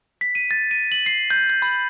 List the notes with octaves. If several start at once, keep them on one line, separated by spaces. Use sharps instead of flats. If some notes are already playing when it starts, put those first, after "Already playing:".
B6
D#7
A6
D#7
F#7
C7
G6
G6
B5